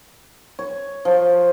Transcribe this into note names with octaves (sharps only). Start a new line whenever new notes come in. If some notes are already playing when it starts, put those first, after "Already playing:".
C#5
F3